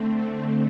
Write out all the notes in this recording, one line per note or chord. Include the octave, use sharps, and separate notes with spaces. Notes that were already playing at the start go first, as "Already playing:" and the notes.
Already playing: D3 A3 C4